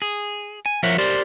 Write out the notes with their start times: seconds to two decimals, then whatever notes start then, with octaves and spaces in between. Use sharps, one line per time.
0.02 G#4
0.66 G#5
0.83 F3 A#4 C#5 E5 F#5
0.98 G4 A#4 C5 D5